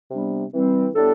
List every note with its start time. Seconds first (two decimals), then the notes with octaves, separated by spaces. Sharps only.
0.11 C3 G3 B3 D4
0.54 E3 G3 C4
0.95 A2 G3 B3 D4 A4